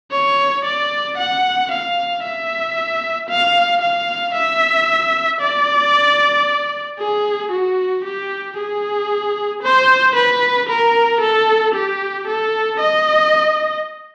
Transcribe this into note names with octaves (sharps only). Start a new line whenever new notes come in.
C#5
D5
F#5
F5
E5
F5
F5
E5
D5
G#4
F#4
G4
G#4
C5
B4
A#4
A4
G4
A4
D#5